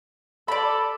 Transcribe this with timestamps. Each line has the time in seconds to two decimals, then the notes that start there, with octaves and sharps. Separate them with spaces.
0.48 A4 D5 B5